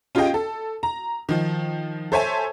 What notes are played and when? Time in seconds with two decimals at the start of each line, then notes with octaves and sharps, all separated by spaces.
0.15 C#4 F4 G4 G#4 D#5 G5
0.34 A4
0.83 A#5
1.29 D#3 F3
2.12 A4 C5 C#5 E5 G#5 A5